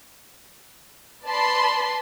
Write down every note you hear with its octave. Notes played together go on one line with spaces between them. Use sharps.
B4 D5 A5 B5 C6